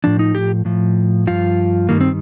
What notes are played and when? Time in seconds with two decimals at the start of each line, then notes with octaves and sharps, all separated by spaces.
0.04 A2 F3 D4
0.19 D#4
0.35 G4
0.65 A2 F3
1.27 G2 F3 F4
1.89 G2 D#3 G3 A#3
2.01 C4